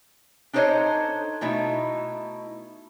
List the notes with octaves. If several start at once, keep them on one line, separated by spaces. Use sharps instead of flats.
D4 D#4 A4 C5 C#5 D#5
B2 A3 D#4 E4